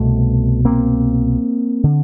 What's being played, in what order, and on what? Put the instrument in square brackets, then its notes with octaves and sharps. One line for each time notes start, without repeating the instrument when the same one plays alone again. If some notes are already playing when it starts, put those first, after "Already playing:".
Already playing: [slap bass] C2 B2 A3 B3
A#3 C4
D3